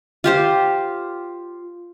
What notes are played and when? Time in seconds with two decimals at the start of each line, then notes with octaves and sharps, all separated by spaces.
0.24 F4 G4 C5